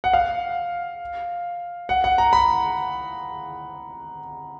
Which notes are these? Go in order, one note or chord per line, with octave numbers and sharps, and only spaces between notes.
F#5
F5
F#5
F#5
A#5
B5